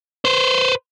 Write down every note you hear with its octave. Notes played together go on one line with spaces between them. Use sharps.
B4 C5